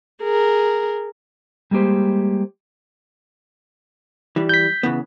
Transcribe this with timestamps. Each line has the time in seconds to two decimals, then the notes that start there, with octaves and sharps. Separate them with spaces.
0.23 G#4 A#4
1.71 G3 G#3 A#3 G4 C5
4.36 E3 G3
4.49 G6 B6
4.83 C#3 E3 B3